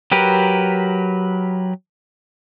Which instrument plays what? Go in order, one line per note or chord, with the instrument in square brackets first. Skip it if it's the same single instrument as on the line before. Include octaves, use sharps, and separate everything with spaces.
[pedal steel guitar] F#3 G4 A#4 B4